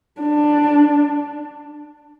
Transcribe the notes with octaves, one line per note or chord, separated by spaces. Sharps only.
D4